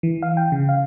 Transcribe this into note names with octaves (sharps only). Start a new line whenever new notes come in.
E3
F5
G5
C#3
F5